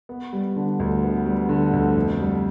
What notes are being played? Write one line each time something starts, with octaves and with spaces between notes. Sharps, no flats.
B3
G3
D3
D2
B3
G3
D3
D2
F2
G3